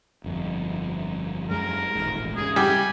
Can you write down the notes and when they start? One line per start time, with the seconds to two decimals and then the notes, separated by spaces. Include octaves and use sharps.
0.24 G1 F2
1.50 F#2 G#3 A#4
1.95 D#1 A1 G#2
2.37 G#2 C#3 G#4
2.56 G3 G#5